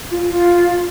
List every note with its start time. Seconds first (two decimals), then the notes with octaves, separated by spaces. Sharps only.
0.11 F4
0.28 F4